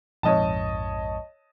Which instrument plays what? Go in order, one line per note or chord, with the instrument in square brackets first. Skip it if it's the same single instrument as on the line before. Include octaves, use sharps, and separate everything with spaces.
[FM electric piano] A#1 F2 G#2 [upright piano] C#5 D#5 A5